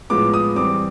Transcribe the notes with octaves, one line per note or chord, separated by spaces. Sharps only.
A2 F3 G#3 B3 D6
D#6
E3 G3 C4 D6